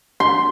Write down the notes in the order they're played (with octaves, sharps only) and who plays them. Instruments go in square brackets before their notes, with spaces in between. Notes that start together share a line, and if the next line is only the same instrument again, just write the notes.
[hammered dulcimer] C6